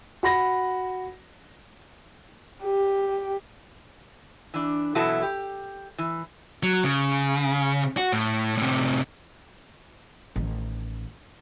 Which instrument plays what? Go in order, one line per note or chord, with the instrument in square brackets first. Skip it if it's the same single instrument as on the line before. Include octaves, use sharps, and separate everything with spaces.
[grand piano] F#4 B5 A#6
[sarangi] G4
[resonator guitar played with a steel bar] E3 D4
B2 E3 F#3 E4 F#4 A4
G4
E3
[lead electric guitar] F#3
C#3
F#4
A2
A2 C3
[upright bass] A1 D#3